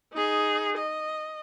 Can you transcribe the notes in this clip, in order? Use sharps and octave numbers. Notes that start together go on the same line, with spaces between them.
D#4 G#4
D#5